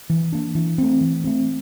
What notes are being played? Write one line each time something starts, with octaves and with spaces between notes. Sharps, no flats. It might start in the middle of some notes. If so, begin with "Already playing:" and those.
E3
A#3 D4
E3
A3 C4
E3
A3 C4